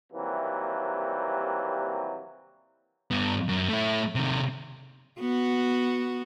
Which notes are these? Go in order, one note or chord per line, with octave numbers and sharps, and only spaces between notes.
D#2 C3 E3 F#3 G3 A#3
G2 B3
F#2
A3 E4
C3 D#3
B3 F#4